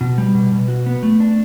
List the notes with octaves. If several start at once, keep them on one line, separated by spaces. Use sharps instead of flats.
B2
G3
B2
B2
F#4
B3
A3
D4